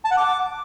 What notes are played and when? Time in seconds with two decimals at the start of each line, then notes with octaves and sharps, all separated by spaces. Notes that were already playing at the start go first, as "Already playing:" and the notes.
0.05 A5
0.11 F#5
0.17 D6